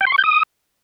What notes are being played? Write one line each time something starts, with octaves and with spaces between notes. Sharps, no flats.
G5
C6
C#6
G6
D#6